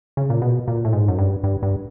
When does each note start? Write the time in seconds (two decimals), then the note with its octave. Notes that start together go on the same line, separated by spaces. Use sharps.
0.17 C#3
0.30 A#2
0.42 B2
0.68 A#2
0.85 A2
0.93 G#2
1.08 F#2
1.19 G2
1.44 G2
1.63 G2